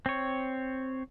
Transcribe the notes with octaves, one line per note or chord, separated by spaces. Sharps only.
C4 C#5